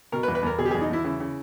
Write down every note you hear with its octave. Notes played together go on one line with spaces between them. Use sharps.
B2 A#4
B4
E2
B4
E2 A#4
B2 G#4
G4
E2 G#4
D#4
E2 E4
C#3 E4
C#3